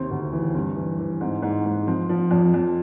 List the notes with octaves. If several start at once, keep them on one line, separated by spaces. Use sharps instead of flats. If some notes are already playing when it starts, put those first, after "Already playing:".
Already playing: D#2 C3 C4
D2
E3
G2 C4
E3
E3
G#2 C4
G#2
G#2
F3 C4
F3
F2
F2